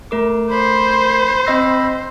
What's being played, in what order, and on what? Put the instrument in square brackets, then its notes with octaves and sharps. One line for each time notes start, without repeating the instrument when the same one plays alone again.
[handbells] A3 A#4 D6
[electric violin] C5 [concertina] B5
[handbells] C4 D#5 A#6 [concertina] B5 E6